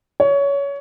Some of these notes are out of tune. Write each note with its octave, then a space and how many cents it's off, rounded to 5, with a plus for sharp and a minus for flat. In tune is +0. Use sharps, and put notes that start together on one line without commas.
C#5 +20